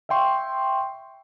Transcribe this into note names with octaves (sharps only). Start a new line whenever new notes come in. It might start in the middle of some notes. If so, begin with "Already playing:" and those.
E5 F5 G5 C6 C#6